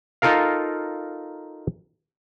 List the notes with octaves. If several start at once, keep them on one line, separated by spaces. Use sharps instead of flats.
D#4 F4 A4 A#4 F5